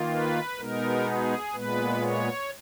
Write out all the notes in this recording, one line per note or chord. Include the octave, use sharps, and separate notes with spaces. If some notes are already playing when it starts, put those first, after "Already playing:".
Already playing: D#3 A#3 F4
B4
B2 G#3 B3 D#4 A#4
G#4
A#2 G#3 B3 B4
C#5